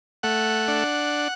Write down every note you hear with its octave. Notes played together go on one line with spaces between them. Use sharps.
A3 F#5
D4